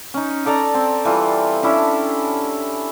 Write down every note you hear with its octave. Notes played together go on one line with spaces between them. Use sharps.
C#4 D#4
A4 D5 A5 A#5
C4
E3 G3 F4 A4
C#4 D4 E4 G4